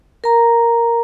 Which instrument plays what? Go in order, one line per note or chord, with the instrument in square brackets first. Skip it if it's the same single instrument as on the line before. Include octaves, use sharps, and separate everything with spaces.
[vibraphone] A#4 A#5